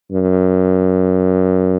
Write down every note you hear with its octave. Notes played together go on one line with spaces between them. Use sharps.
F#2